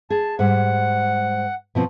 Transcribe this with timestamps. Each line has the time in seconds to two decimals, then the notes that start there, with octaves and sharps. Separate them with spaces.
0.10 G#4 A5
0.39 G#2 G3 F#5
1.75 B2 F3 C4